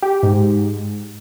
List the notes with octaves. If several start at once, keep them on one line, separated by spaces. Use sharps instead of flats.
G4
G#2